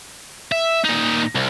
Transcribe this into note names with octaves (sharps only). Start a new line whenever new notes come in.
E5
A#2 D#4
C2